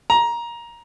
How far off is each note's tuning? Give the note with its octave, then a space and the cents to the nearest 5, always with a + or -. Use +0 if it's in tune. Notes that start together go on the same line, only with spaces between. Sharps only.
A#5 +15